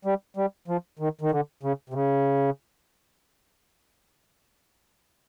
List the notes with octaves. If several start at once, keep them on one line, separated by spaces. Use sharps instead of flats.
G3
G3
F3
D#3
D#3
D3
C#3
C3
C#3